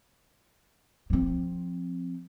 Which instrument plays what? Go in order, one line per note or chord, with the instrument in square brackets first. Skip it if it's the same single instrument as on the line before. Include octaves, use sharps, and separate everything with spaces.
[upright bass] F3 C4